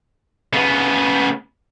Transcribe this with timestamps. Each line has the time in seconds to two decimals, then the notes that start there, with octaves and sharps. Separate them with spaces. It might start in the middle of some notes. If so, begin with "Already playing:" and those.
0.53 C#3 B3